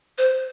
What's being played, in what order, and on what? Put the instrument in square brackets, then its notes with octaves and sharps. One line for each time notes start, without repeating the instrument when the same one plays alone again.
[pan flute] C5